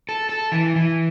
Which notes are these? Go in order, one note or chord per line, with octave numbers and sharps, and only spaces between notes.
A4
A4
E3
E3